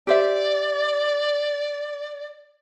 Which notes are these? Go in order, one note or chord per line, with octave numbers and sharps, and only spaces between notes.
G4 C5 D5 E5